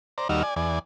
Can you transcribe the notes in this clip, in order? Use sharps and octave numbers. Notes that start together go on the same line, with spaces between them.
C5 D5 A#5
D#2 G3 D#4 F#4 E6 F6
D5 G#5
E2 D5 G#5